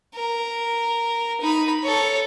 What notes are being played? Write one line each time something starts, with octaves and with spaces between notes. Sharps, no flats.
A#4
D#4 B5
A4 C#5